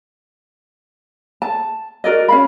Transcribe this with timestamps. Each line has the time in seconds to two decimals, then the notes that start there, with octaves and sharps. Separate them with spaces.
1.42 A5
2.04 F#4 A#4 D5 D#5
2.28 C#4 F5 B5